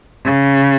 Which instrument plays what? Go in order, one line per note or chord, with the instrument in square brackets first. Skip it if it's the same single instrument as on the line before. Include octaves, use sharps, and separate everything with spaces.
[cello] C#3